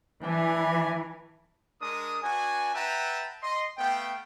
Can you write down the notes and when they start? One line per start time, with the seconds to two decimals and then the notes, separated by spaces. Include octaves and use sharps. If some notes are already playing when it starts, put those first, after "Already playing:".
0.23 E3 D4 G#5 A5
1.80 G#3 D4 A#4 D#6
2.23 D4 F#4 B4 G#5
2.75 B4 E5 F#5 G5 A5 A#5
3.42 D#5 C6
3.77 A3 B3 F5 G5